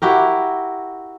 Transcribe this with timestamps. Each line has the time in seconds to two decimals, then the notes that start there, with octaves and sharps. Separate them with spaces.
0.02 E4 F#4 G4 A#4